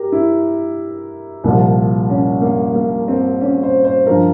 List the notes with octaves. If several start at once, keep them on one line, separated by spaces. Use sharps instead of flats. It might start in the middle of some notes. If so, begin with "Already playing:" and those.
Already playing: G4 A#4
E4
C2 A#2 F3
C#4
A#3
A#3
C4
C#4
C5
C5
G2 F3 A#4